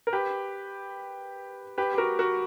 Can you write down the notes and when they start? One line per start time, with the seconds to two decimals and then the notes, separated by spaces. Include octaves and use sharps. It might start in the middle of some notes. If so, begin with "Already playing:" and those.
0.07 A#4
0.13 G4 B4
1.78 G4 B4
1.94 G4
1.98 F#4 A#4
2.19 F#4 A#4